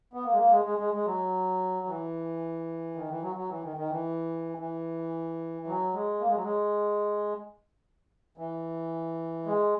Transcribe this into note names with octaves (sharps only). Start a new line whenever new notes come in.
B3
A#3
G#3
A#3
G#3
G#3
G#3
G#3
F#3
E3
D#3
E3
F#3
F#3
E3
D#3
D#3
E3
E3
F#3
G#3
A#3
G#3
F#3
G#3
E3
G#3